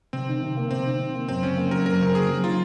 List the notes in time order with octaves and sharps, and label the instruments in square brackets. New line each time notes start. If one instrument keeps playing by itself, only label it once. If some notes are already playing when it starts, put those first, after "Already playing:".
[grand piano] C3 [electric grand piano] C4
[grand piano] D#3
C3
A#3
[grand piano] C3 [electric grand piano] C4
[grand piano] D#3
C3
A#3
[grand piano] F#2 [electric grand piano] C4
[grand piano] C#3 [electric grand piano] C#4
[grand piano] A#3
[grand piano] F#3 [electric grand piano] A#4
[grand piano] F#2 [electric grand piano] A#4
[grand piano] C#3 [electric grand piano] A#4
[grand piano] A#3 [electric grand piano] G#4
[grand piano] F#3
[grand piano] D#3 [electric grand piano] F4